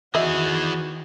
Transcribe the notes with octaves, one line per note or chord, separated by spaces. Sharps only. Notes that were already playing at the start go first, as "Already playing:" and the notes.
D#3 E3 F#4 G#4 D#5 E5